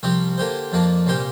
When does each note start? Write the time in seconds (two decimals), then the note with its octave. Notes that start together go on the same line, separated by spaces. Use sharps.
0.03 C2 C3 F3 C4 G4
0.38 D3 A#3 G4 C5
0.72 F2 F3 A#3 D4
1.07 C2 A#2 A#3 G4 C5